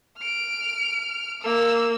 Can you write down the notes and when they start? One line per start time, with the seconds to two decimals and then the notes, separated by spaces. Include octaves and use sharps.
0.18 F6 D7
1.42 A#3 E6